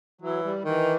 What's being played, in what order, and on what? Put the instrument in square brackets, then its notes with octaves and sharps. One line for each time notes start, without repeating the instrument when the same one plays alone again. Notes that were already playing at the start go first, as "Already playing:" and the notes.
[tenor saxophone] E3 [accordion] F#3
[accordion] G3
[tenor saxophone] D#3 [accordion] E3